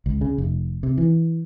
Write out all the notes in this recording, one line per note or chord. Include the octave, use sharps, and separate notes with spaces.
C#2
C#3
F1
C3
E3